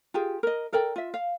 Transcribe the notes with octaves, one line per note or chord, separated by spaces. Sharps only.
F4 G4 G#4
A#4 D#5
A4 A#4 D5 G5
F4 E5
F5